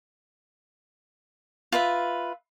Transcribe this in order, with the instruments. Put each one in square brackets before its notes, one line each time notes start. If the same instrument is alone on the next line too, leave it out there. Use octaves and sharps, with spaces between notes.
[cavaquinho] F4 B4 E5